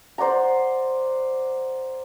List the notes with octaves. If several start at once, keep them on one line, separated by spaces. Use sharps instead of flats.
C5 D5 F#5 A#5